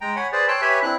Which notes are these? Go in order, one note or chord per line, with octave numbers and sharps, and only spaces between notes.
G#3 G5 A#5
C#5 F#5 G#5 B5
G#4 B4 C5 D5
C#5 G5 A5 C6 E6 F#6
G4 B4 C#5 E5 G#5 B5
C4 D4 E4 F#6